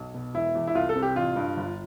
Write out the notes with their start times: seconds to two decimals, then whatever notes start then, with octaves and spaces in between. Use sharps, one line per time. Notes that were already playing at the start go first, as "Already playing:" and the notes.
Already playing: B1
0.14 B2
0.34 E1 E4
0.55 E2
0.67 E4
0.75 C2 F4
0.89 A4
0.95 C3
1.02 G4
1.16 A1 F4
1.36 G2
1.57 G1